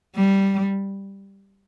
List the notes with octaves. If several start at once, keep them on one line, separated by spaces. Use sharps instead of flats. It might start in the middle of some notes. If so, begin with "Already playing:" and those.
G3